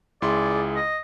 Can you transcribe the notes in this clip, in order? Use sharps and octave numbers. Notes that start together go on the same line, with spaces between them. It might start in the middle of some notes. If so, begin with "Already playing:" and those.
C#2 E4 G#4 D5 C6
D#5